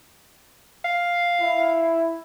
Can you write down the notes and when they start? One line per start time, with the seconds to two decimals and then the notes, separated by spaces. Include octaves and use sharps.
0.85 F5
1.42 E4